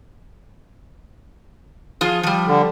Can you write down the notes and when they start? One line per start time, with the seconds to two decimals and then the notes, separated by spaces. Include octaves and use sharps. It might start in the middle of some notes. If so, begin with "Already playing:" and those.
2.01 F3 F4 G#4
2.23 F3 G3
2.47 D3